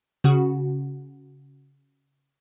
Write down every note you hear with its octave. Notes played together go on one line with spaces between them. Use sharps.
C#3 F#4